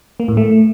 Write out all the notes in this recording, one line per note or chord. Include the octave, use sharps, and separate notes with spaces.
A#3
A2
A3